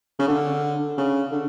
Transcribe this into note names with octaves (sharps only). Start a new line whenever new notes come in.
C#3
D3
C#3
D3